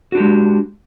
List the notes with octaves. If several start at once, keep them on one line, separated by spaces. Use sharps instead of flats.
G#3 D4 F#4 G4